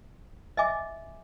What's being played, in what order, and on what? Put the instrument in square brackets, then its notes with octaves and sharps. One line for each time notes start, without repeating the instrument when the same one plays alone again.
[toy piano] D#5 E5 G#5 D6